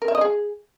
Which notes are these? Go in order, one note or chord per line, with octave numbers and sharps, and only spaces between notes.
A#4
E5
D#5
G#4